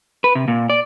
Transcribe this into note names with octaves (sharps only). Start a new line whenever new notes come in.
B4
C3
A#2
D5